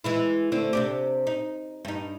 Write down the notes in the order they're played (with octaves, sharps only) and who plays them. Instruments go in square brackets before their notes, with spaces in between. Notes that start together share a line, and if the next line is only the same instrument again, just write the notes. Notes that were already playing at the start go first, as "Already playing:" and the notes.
[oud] E3 G#3 E4
D3 A3 C4
C3 D4 G4
D#4
G2 D#4